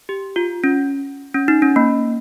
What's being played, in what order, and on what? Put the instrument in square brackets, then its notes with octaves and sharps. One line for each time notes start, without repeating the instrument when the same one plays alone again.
[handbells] G4
F4
C#4
C#4
D#4
C#4
A#3